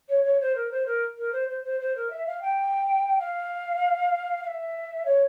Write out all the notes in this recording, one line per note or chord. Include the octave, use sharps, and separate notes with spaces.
C#5
C#5
C5
A#4
C5
A#4
A#4
C5
C5
C5
C5
A#4
E5
F5
G5
F5
F5
E5
C#5